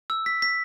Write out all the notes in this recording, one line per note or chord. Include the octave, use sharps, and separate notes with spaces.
E6
B6
B6